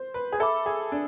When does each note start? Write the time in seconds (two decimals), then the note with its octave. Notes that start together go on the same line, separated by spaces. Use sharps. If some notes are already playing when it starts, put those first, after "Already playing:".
Already playing: C5
0.14 B4
0.32 G#4
0.40 A4 E5 B5 D6
0.66 G#4
0.92 D4